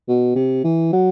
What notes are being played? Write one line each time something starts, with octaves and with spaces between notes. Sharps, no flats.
B2
C3
E3
F#3